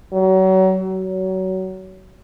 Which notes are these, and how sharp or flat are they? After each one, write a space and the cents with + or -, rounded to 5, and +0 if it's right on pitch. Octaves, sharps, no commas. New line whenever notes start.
F#3 +35
F#3 +25